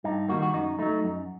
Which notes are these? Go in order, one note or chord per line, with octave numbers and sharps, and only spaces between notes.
G2 D#4
D#3 G3 A#3 F#4
F#4
F#2 D#4
F#3 A3 D#4
F#2